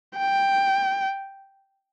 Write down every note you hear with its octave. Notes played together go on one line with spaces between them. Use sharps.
G5